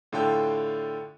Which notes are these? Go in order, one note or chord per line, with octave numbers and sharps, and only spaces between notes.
A2 D3 F4 A4 G5